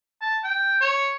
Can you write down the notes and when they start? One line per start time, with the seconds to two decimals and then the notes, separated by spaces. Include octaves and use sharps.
0.21 A5
0.43 G5
0.81 C#5